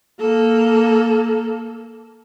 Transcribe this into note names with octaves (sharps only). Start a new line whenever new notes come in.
A#3 A4